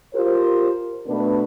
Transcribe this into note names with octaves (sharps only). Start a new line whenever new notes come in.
F4 G4 A#4 C5
B2 A3 B3 D4 B4